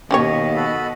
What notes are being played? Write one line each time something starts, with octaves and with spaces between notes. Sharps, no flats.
D#2 B2 C#4 G4 C#5 D#5
F#4 A4 B5